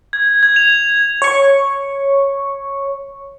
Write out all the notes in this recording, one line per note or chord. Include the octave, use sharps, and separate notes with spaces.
G#6
G#6
F7
C#5 C#6